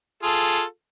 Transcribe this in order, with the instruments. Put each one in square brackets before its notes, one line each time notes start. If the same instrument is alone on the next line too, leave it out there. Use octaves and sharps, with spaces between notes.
[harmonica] F4 G#4 A4